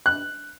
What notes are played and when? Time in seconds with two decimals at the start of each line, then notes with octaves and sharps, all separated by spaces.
0.06 F#6